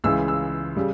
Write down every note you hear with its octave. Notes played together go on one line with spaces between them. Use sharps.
C#2 C#3 E3 E6
E6
C#3 G3